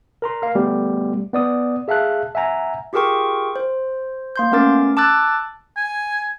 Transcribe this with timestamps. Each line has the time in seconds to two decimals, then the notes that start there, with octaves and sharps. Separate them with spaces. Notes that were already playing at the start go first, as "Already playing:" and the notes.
0.22 A#4 A#5 C6
0.42 A#4 F5
0.55 G3 A3 B3 G4
1.33 B3 D5 D#6
1.88 G#4 E5 F5 A5 F#6
2.35 E5 F#5 G#5 A#5
2.93 F4 G4 G#4 A#4 G5 C#6
3.56 C5
4.36 A#3 C6 G6
4.52 A3 B3 C#4 A#4 D6 A6
4.97 A5 D6 E6 F#6 A6
5.77 G#5